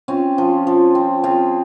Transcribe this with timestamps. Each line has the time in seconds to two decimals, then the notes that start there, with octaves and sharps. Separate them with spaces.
0.08 C4 C#4 F4
0.38 F3
0.67 F3
0.95 C4
1.24 C4 F4 G#4